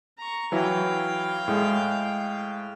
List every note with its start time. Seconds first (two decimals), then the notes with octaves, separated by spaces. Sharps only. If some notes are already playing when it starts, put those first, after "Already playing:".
0.18 A#5 C#6
0.52 E3 F#3 E4 F5 G5
1.48 A2 G#3